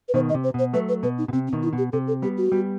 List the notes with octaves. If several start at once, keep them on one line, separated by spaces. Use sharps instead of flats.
B4
B2 D#3 C5
D#5
C3
C5
B2 C5
F#3 A3 B4
B4
B2 B4
D#4
B2
C3 C4
C4
B2 D#3
E4
B2
G4
C3 A4
A4
G3 B3 G4
F#4
G3 B3